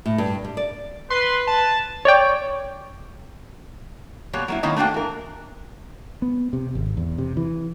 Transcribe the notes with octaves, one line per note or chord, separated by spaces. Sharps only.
A2
G2
G3
D5
B4 C6
A5
C#5 D5 G5
B2 G3 A#3 C#5
F#3 A#3 E4
D#3 A#3 C4 E4 C#5 D#5
A3 A#3 D4 F#4 G5
E3 A#4
B3
C3
G#1
E2
C3
E3